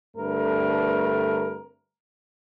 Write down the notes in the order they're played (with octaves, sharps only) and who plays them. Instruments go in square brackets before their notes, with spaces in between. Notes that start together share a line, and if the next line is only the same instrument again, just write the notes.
[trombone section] G2 D3 A3 C4 A#4 B4